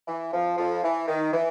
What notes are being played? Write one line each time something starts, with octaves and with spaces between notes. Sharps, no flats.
E3
F2 F3
F2 F3
E3
D#3
E3